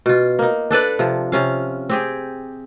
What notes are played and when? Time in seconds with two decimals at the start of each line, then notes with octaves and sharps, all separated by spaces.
0.06 B2 F4
0.39 A#3 D#4
0.71 D4 A4 B4 D5
0.99 C3 F3
1.32 C3 C#4 F5
1.89 C4 G4 G#4